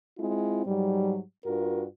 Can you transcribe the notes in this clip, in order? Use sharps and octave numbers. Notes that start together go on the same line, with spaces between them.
G#3 C4 E4 F4
G#2 F#3 G3
G2 F4 F#4 A#4